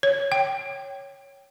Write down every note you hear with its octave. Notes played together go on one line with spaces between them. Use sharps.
C#5
G5